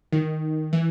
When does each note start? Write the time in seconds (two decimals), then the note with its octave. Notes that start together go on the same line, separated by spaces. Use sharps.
0.12 D#3
0.73 E3